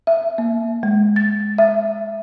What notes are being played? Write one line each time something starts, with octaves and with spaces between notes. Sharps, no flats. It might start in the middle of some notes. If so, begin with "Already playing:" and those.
E5
A#3
G#3
A6
E5